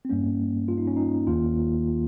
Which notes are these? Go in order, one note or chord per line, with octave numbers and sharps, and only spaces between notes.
C4
G2 G3 A#3 C#4
F4
D#4
C#4
D#4
D#2 D#3 A#3 F4